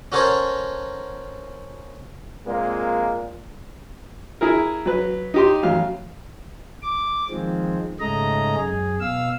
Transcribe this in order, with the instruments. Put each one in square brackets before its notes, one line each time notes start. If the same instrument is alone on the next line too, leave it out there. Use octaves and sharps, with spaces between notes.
[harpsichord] C#4 F#4 A4 A#4 C5 C#5
[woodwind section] A#2 [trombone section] G#3 A#3 C4
[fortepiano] E4 G#4 A#4
F#3 B4
D#4 G4 C6
A1 F#3 F5
[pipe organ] D6
D#3 F3 G#3 C4
G#2 C#3 G#3 A3 D#5 A#5
F#2 G#4
B2 F5 E6